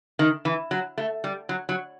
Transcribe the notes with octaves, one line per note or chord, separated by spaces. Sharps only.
D#3
E3
F#3
A3
G3
F#3
F#3